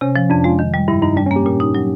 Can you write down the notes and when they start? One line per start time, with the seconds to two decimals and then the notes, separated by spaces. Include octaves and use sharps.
0.01 C3 C#4
0.16 F3
0.30 F2 D4
0.44 G#3 F4
0.59 D#3
0.74 G3
0.88 G2 E4
1.02 G2 D#4
1.17 G3 D4
1.26 C#4
1.31 A#3
1.36 G4
1.46 A#2
1.60 D#4
1.75 F#3